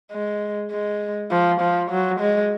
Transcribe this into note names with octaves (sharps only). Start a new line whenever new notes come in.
G#3
G#3
F3
F3
F#3
G#3